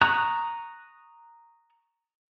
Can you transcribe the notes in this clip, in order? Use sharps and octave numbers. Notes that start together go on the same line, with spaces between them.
A#5 C#6 D#6 F#6